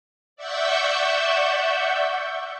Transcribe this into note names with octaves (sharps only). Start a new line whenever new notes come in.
D5 E5 F#5 C#6 E6 G6